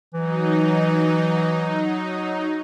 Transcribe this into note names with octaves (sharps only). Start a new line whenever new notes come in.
E3 F#3 D#4